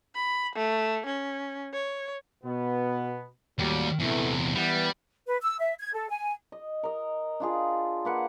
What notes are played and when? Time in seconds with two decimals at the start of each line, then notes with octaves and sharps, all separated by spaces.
0.15 B5
0.55 A3
1.06 C#4
1.74 C#5
2.44 B2 B3
3.59 D#2 A2 F#3 G3
4.00 E2 C3 E3 A3
4.55 E3 G3 B3
5.27 B4
5.42 E6
5.60 E5
5.79 G#6
5.93 A4
6.10 G#5
6.52 D#5
6.83 A#4 D#5
7.40 D4 F4 G#4
8.05 A#3 B4 F#5